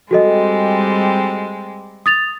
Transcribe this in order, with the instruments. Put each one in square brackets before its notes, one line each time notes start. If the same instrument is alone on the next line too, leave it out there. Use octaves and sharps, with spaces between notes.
[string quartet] G3 G#3 C4 [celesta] F#4 A4 D#5
[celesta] D#6 A6 F7